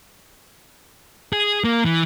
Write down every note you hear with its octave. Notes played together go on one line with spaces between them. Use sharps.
G#4
A#3
E3